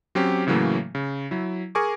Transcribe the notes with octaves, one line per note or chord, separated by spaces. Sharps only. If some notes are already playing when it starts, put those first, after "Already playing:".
F#3 C4 C#4 G4
A2 C#3 E3 F#3 A3 A#3
C#3
F#3 E4
G#4 A#4 G#5 C#6 D6